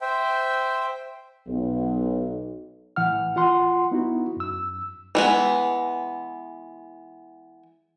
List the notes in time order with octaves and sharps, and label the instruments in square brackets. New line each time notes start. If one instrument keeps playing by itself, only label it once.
[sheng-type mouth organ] C5 E5 G5
[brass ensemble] B1
[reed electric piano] A2 E3 F#5 F6
F4 F#5 C6
B3 D#4 E4 F#4
F#2 E6
[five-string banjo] E3 G#3 B3